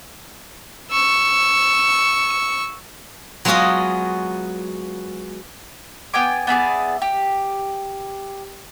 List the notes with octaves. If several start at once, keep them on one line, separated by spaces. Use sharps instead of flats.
C#6 E6
F#3 G#3 B3 F4 F#4 D#5
B3 G5 G#5 D6
B3 E4 G#4 D5
G4